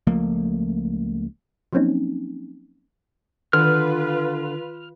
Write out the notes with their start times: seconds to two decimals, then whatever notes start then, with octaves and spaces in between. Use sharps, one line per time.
0.07 C#2 F3 A3 A#3
1.73 F3 F#3 A#3 C4 C#4 D#4
3.53 D3 D#3 F4 B4 F6